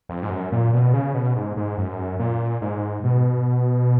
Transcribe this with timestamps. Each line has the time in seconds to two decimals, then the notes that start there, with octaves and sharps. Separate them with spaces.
0.09 F2
0.23 G#2
0.30 F#2
0.52 A#2
0.73 B2
0.94 C#3
1.14 B2
1.36 G#2
1.57 G#2
1.78 F#2
2.19 A#2
2.61 G#2
3.04 B2